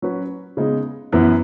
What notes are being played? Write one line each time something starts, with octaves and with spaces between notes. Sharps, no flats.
F#3 C#4 F#4 B4
C#3 G#3 B3 D#4
F#2 E3 B3 E4 B4